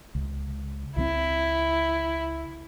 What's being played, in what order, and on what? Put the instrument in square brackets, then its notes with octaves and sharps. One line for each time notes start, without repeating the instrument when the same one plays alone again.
[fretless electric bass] C#2
[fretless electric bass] C#2 F3 C4 [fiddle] E4